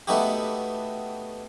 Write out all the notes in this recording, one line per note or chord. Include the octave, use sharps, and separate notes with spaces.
A3 B3 D4 D#4 F#4 G4